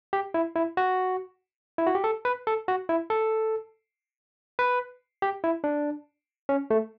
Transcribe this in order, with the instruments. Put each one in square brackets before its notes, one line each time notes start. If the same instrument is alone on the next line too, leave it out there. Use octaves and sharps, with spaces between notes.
[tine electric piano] G4
E4
E4
F#4
E4
F#4
G4
A4
B4
A4
F#4
E4
A4
B4
G4
E4
D4
C#4
A3